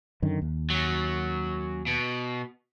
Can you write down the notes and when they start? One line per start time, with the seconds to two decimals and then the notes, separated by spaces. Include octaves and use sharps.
0.22 F#2 D3 D#3
0.42 D#2
0.70 F#3 C#4
1.87 B2